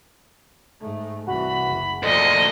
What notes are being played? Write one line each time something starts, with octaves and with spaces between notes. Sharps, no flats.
G#2 A3
C2 E3 F#4 B5
F#1
D2 A#2 D3 F3 D#5